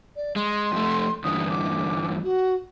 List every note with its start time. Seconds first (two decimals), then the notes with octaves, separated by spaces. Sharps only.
0.16 D5
0.36 G#3 C6
0.72 F2 A3
1.24 E2 G2 D3 D#6
1.50 D6
2.24 F#4